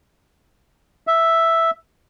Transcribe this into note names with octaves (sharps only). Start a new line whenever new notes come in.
E5